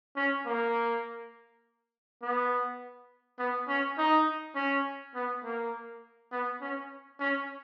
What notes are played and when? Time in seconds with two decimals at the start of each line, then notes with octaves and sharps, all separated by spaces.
0.16 C#4
0.46 A#3
2.22 B3
3.39 B3
3.68 C#4
3.98 D#4
4.55 C#4
5.15 B3
5.44 A#3
6.32 B3
6.61 C#4
7.20 C#4